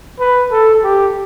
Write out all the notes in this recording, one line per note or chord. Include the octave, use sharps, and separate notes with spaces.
B4
A4
G4